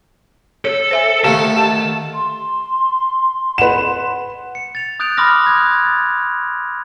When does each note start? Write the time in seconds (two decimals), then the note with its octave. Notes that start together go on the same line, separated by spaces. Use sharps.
0.65 A4 C#5
0.91 C5 E5 G#5
1.24 D3 D#3 A3 G4 F5 A5
1.56 G4 E5
2.15 C6
3.58 B4 F#5 E7
4.55 C#7
4.75 A6 F7
5.00 D#6 F#6 G6 A6 D7 F7
5.17 B5 C6 D6 D#6 F6 A#6
5.46 D#6 F#6 G#6
5.86 A6